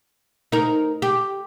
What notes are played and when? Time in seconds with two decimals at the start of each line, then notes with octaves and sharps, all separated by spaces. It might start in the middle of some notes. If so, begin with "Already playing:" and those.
0.52 D#4 A#4
1.02 G4